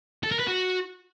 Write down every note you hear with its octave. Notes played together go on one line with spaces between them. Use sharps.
A4
A#4
B4
F#4